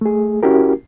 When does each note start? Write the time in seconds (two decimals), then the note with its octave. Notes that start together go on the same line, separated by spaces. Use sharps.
0.01 A3 G#4
0.43 C#4 E4 F#4 G4 A#4